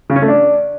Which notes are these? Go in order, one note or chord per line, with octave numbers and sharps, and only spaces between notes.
C#3
C#4
A3
D4